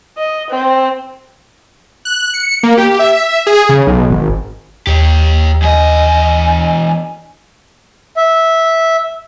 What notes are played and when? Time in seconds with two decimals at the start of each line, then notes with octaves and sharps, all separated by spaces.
0.17 D#5
0.50 C4
2.05 F#6
2.34 C#7
2.63 A#3
2.77 G4
2.99 E5
3.47 G#4
3.69 C#3
3.87 B1
4.10 G#1
4.87 D#2 G4 C#5
5.62 E2 D#5 G#5
8.17 E5